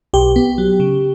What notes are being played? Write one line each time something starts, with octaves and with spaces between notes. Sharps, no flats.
B1 G4
B3
F#3
C#3